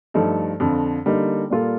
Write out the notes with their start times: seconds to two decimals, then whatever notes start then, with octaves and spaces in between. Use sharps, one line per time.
0.14 G2 F3 A3 D#4 A4
0.60 F2 D3 F3
1.06 D3 G3 A#3 D#4
1.50 A#2 G3 A#3 F4 A4